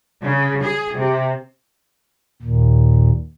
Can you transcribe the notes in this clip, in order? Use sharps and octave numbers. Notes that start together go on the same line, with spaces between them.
C#3
G#4
C3
D#2 A#2